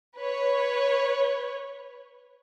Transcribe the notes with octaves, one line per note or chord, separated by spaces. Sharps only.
B4 C#5